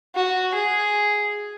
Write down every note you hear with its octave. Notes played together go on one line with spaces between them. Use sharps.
F#4
G#4